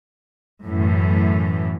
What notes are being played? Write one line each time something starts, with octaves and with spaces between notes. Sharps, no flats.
F#2 A2 E3